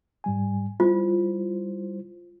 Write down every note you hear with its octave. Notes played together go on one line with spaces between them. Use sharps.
G#2 G3 G#5
G3 E4 F4 C5